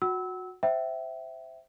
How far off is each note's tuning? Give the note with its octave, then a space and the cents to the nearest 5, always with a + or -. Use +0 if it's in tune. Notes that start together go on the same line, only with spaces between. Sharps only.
F#4 -25 F#5 +30 E6 -25
C5 +0 E5 +0 G5 -30